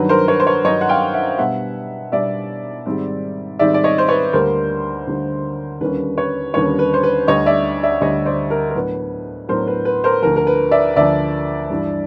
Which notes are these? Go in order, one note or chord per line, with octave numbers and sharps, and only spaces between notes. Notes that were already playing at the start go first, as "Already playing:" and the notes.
Already playing: G2 D#3 F#3 B4
A#4 C5
B4 C#5
C5
B4 C#5
G2 D#3 F#3 C#5 D#5
F#5
F5 G5
E5 F#5
B2 G3 B3 D4 E5 F#5
B2 G3 B3 D4 D5 E5
G#2 D#3 G3 C4
G#2 D#3 G3 C4 D5 E5
D5
C#5 D#5
C5
B4 C#5
D2 D3 G3 A#3 A#4 C5
D2 D3 G3 A#3
D#2 D3 G3 A#3 C#4 B4
B4 C#5
D#2 D3 G3 A#3 C#4 B4 C#5
B4
C5
B4
D2 D3 G3 C#5 D#5
D5 E5
D5 E5
D2 D3 G3 C#5 D#5
C5 D5
A#4
A#4
A2 F#3 B3 D4 B4
A2 F#3 B3 D4 A#4 C5
B4
B4
A#4 C5
D2 D3 F3 A#4
A#4
B4
D5 E5
D2 D3 F3 D5 E5
G2 E3 G3